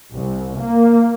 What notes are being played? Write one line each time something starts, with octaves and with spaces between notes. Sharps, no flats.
C2
A#3